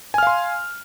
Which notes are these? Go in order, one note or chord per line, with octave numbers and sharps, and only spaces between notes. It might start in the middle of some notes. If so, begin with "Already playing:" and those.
F5 G#5 C6 F6